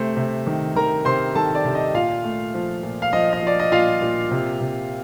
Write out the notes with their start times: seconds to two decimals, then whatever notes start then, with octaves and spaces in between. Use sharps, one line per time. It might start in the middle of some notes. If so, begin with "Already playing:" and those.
Already playing: C3 A3 C5
0.17 C3
0.47 D#3
0.75 D#3 A#4 A#5
1.05 C3 C5 C6
1.35 D#3 A4 A5
1.55 D5
1.65 C3
1.75 D#5
1.94 A#2 F4 F5
2.24 A3
2.54 F3
2.83 A#2
3.02 F5
3.12 F3 D#5
3.33 D#5
3.42 F3 D5
3.60 D#5
3.72 A#2 F4 F5
4.02 A#2
4.31 C3
4.61 C3